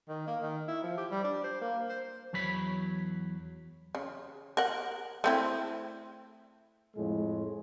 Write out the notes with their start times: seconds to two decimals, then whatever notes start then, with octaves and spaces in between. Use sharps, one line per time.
0.08 D#3
0.27 A#3
0.42 D#3
0.68 E4
0.83 F3
0.97 G4
1.11 G3
1.24 D4
1.44 C5
1.61 A#3
1.89 C5
2.33 E2 F#3 C#5 B5
3.95 C#3
4.57 A#4 F#5
5.24 A3 C4 E4
6.95 F2 A2 F3 G#3